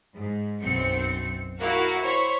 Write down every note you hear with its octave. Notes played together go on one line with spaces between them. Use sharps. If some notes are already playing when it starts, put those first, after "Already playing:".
G#2
B1 F#2 C4 C#7
E4 F#4 A#4 F5 F#5
C5 C#5 B5 C#6